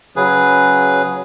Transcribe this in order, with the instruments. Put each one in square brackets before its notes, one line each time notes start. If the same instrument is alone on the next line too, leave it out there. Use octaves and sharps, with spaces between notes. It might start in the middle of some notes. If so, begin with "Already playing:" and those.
[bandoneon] C#3 F#3 G#4 B4